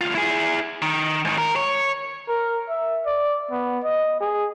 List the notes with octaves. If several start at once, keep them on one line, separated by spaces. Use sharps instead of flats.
D2 F4
E4 G#4
D#3
G#2 D#3
A#4
C#5
A#4
E5
D5
B3
D#5
G#4